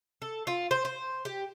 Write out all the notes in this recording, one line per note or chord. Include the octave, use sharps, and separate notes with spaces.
A4
F4
C5
C5
G4